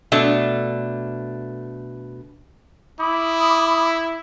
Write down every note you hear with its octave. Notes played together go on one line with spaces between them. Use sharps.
B2 A3 D4
E4 B5 D6 D#6